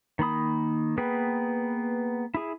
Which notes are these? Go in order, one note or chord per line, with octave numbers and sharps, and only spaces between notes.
D#3 A#3 B5 D#6
A#3 B3 G#4 B4 G5
E4 G#4